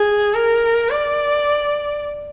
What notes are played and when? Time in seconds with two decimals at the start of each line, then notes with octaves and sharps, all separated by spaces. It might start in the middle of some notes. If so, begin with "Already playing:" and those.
Already playing: G#4
0.34 A#4
0.90 D5